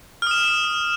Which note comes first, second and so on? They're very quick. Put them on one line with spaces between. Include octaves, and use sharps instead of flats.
F6 D#6 E7